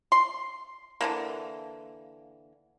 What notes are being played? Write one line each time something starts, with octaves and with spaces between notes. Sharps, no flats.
C6
D3 E3 A#3